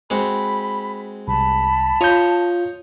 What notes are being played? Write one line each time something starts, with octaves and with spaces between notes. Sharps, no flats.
G#3 C4 F#4 B5
C2 A5 B5
F4 C#5 D#5 A#5 G6